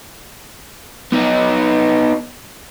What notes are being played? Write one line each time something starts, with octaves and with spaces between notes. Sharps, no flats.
B3 D#4